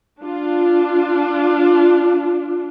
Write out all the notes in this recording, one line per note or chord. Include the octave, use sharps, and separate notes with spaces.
D4 F4